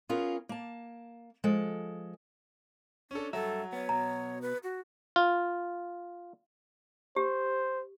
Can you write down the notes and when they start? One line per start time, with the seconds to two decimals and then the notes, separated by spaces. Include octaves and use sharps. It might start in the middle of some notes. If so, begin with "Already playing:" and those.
0.09 B3 C#4 F4 G#4 A#4
0.49 A#3 A5
1.44 F3 G#3 A4
3.11 C#4 D4 A4
3.33 G2 F#3 A4 E5
3.73 B3 C#5
3.89 B2 A#5
4.42 B4
4.64 F#4
5.16 F4
7.16 G4 C5